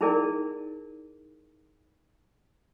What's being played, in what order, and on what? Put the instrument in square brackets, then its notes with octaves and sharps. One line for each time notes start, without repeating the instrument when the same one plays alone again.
[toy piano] D#4 E4 G#4 A#4 D5